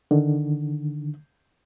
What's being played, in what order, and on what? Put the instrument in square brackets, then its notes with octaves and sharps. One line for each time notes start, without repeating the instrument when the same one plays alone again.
[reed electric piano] D3 D#3